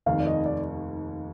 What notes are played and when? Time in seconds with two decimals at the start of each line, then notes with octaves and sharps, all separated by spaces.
0.06 F1 D#2 D#3 F5
0.20 D5
0.27 D#5
0.46 D5